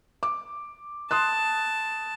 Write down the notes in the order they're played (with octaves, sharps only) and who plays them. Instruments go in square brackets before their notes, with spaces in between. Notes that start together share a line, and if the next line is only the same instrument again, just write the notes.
[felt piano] D6
[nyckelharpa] A5 [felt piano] C6 D#6 F#6